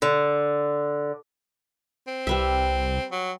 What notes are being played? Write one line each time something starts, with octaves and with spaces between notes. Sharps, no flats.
D3
C4
C2 G3 B4 E5
F#3